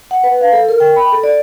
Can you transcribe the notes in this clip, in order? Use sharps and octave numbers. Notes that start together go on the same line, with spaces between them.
F#5
B4
F5
A4
A#4
G5
B5
A4
D5